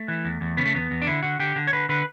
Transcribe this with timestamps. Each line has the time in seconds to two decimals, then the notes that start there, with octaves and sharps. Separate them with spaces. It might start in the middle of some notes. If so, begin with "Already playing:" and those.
Already playing: A3
0.08 E3
0.25 E2
0.41 E2
0.57 C#3 B3
0.65 A3
0.74 E2 B3
0.91 E2
1.02 D4
1.07 D3 E4
1.23 D3 F#4
1.39 D3 G4
1.56 D3
1.67 C#5
1.73 D3 B4
1.89 D3 B4